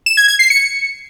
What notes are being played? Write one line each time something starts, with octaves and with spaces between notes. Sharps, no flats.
E7
G#6
G#6
C7
C#7